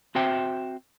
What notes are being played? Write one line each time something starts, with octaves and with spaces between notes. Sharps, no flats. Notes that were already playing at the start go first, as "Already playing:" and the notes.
C4 F#4 C5 E5 G5